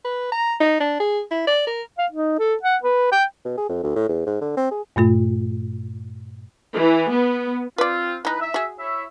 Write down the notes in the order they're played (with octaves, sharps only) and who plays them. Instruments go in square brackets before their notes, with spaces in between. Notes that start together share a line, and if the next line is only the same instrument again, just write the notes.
[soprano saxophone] B4
A#5
D#4
D4
G#4
E4
D5
A#4
[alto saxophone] F5
D#4
A4
F#5
B4
G5
[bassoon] B2
G#4
F2
D2
A2
E2
G#2
D3
C4
G#4
[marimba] G2 A#2 A3 F4
[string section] E3
B3
[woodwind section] C4 F4 [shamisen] B4 D5
[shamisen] E3 D#4 [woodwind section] B4
[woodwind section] E5
[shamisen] F#4 G#4
[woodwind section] E4 C#5 E5